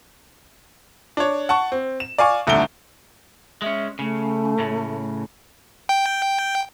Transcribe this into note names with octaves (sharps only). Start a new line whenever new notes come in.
D4 C#5
F#5 A5 C#6
C4
E7
D5 F5 G#5 C#6
D#1 C2 D3 A3 D7 G7
G#3 C#4 E5
C#3 A3
A2 C#3
G5